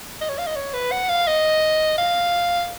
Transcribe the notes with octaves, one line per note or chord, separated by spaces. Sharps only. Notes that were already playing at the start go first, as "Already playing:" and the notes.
D#5
C#5
F5
D#5
C#5
B4
F#5
F5
D#5
F5